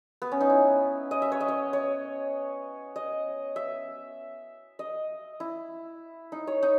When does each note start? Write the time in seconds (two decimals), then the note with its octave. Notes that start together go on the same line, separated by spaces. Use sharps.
0.22 B3
0.32 C#4
0.41 D#4
0.50 E4
1.11 D#5
1.22 E5
1.32 C#5
1.40 D#5
1.48 C#5
1.73 C#5
2.96 D#5
3.56 E5
4.79 D#5
5.40 E4
6.32 D#4
6.47 C#5
6.63 D#4